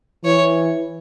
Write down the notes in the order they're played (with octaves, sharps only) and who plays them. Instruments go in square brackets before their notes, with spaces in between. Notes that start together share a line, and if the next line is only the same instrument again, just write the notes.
[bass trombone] E3 [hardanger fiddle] C#5